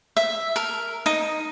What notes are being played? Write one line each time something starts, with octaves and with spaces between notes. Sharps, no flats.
E5
A#4
D#4